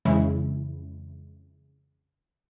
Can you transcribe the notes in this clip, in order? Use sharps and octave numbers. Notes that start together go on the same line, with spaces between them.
F2 C#3 E3 G#3 E4